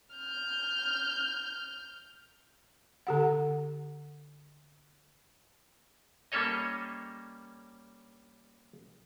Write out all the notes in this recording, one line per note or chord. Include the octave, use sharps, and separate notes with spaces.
F6 G6
D3 G4 F#5
G3 A#3 C#4 A4 C#5 D#5